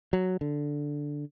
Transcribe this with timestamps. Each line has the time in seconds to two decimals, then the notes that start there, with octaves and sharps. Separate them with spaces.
0.13 F#3
0.41 D3